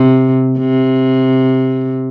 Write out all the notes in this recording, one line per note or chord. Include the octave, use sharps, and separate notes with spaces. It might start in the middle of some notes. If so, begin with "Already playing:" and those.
Already playing: C3
C3